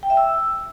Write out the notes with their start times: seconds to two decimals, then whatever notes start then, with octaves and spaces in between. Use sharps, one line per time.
0.03 G5
0.10 E5
0.17 E6